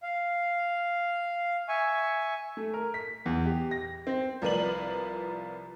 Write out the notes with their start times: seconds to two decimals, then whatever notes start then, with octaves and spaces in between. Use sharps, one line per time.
0.03 F5
1.68 E5 G#5 C#6
2.57 A3
2.74 A#4
2.94 B6
3.26 E2
3.45 G4
3.71 A#6
4.07 C4
4.42 C2 F3 A#4 B4 D5 F#7